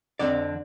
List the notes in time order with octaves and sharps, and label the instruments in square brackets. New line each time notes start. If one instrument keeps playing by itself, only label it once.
[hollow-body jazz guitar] F2 D3 F3 C4 D5